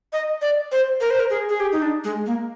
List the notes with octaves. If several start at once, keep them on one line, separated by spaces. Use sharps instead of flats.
D#5
D5
C5
A#4
C5
A#4
G#4
G#4
G4
D#4
D4
G#3
A#3